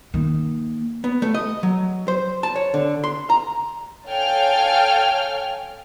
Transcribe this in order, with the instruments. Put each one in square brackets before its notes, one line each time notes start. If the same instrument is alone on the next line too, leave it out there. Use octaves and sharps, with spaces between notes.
[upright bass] D#3 A#3
[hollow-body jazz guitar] B3
A3
D#5
F#3
C5
A5
C#5
D3
C6
A#5
[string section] A4 C#5 F5 G5 G#5 F6